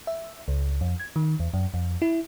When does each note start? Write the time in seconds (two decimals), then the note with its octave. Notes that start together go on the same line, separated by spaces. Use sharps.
0.07 E5
0.48 C#2
0.81 F2
1.00 G#6
1.16 D#3
1.40 E2
1.54 F#2
1.74 F2
2.02 E4